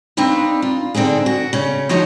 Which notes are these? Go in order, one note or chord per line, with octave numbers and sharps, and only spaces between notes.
C4 D4 D#4 B4 F5
F4
D3 C4 D4 D#4 G#4
F#4
C#3 C#4
D2 F3 D#4 F#4 C#5 D#5